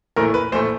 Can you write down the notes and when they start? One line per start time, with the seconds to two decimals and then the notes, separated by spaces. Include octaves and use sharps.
0.16 A#1 A2 E3 A3 A#4
0.34 B4
0.52 A#1 A2 E3 A3 C5